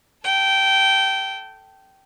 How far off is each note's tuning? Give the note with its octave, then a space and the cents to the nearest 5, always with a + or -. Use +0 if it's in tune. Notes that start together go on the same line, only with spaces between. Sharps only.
A4 +0 G5 -15